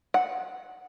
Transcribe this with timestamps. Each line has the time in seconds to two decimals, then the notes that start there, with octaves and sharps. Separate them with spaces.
0.14 F#5